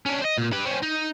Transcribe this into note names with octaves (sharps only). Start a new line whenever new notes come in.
C#4 D4
C5 D#5
A#2
G4 B4
C4 C#4
D#4